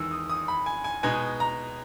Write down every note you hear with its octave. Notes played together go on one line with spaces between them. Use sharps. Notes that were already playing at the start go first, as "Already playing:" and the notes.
Already playing: E2 D#3 G#3 E6
D#6
D#6
B5
G#5
G#5
B2 G#3 D#4 G#5
A#5